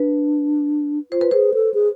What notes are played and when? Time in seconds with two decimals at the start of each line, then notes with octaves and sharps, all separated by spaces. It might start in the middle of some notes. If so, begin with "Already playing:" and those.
Already playing: D4 B4
1.12 F4 C5
1.21 B4
1.31 G#4 C5
1.54 A4
1.74 G#4